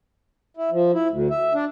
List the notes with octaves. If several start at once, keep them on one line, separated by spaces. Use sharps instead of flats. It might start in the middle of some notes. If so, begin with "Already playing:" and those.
E4
F3
E4
D2
E5
D4